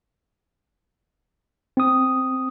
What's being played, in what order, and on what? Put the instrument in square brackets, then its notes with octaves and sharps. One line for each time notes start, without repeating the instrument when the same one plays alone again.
[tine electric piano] C4 D#6